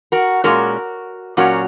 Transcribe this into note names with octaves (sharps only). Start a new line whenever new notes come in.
F#4 A#4
A#2 G#3 C#4 F#4 A#4
A#2 F#3 C#4 F#4 A#4